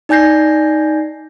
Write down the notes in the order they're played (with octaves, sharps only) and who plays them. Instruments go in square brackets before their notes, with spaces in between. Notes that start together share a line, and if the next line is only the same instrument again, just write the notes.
[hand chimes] D#4 D5 G#5 G6 A#6 C7